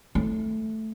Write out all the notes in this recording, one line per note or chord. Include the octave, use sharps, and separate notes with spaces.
A3